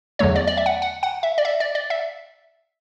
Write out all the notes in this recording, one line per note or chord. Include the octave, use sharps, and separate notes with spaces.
E2 D3 F#3 A3 C#5
D5
D5
E5
F#5
F#5
F#5
E5
D5
E5
D5
D5
E5